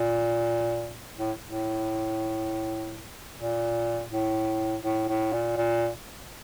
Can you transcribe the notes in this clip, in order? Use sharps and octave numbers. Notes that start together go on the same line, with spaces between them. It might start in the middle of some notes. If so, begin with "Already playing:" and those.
Already playing: A#2
A2
A2
A#2
A2
A2
A2
A#2
A#2